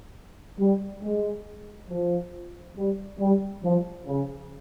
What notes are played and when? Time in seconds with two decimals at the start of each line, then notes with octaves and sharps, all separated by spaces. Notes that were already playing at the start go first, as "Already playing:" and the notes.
0.59 G3
1.02 G#3
1.90 F3
2.76 G3
3.19 G3
3.63 F3
4.06 C#3